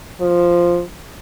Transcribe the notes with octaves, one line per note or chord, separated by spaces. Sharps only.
F3